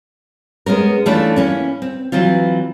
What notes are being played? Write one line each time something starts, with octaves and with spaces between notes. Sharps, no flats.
G#3 B3 C#4 A#4
E3 A3 C#4 D4 E4 F4
A#3 C#4 E4
C4
E3 F#3 C4 F4